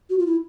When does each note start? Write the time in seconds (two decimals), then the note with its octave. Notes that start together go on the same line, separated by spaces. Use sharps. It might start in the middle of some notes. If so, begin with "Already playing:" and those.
0.10 F#4
0.19 F4
0.27 E4